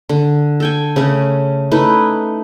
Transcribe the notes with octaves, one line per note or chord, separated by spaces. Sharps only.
D3
A4 G5 G#5
C#3 A3 C#4
A3 D#4 E4 B4